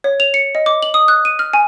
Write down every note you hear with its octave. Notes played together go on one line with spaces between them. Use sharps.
C#5
F7
C#7
D#5
D6
F#7
D#6
F#6
D#7
F6
G#5